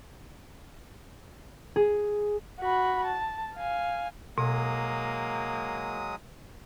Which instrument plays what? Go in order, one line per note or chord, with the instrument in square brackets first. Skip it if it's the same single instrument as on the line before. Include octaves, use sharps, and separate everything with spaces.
[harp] G#4
[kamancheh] F#4 B5
A5
F5 G#5
[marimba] B2 [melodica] F#3 G#3 D#6 [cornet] A#3